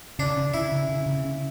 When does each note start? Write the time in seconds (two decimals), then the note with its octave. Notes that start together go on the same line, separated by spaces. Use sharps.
0.19 C#3 D4
0.37 C#3
0.54 C#3 E4
0.72 C#3
0.89 C#3
1.06 C#3
1.25 C#4